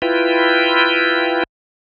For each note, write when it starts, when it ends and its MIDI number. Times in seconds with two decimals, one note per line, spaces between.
0.02 1.43 64
0.02 1.43 65
0.02 1.43 71
0.02 1.43 79